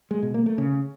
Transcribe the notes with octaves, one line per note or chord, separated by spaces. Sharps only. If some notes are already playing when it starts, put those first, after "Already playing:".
G#3
B2
A#3
A3
C#3